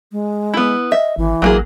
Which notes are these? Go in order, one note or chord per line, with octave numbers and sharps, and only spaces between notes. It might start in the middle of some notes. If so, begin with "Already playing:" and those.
G#3
B3 E4
D#5 E5
G#1 E3
A1 F#3 A#3 G#4